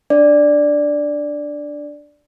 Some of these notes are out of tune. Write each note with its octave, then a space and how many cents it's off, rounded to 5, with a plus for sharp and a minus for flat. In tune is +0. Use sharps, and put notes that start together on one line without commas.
D4 +0 D5 +0